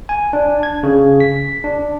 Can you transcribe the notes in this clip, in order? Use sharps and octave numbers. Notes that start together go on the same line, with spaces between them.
G#5
D4
G#6
C#3
B6
D4